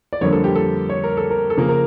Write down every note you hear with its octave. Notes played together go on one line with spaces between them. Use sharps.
D5
F2 D3 G3 A#3 C#5
A4
G4
A4
C#5
A#4
A4
A#4
A4
C#3 F3 A#3 A#4
A#4